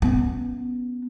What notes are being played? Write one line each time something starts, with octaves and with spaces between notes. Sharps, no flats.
B3 C#4